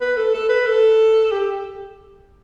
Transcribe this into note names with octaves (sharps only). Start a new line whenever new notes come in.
B4
A4
A4
B4
A4
G4